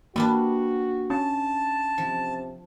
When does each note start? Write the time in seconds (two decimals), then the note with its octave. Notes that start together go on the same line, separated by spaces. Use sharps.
0.16 G3 A#3 B3 D4 F#4
1.10 C#4 A5
1.98 C3 F3